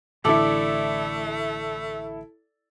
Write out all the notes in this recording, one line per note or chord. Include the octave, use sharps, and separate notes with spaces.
A1 D3 A3 E4 A4 D5